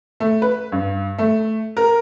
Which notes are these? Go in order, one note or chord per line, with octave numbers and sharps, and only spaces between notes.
A3
B4
G2
A3
A#4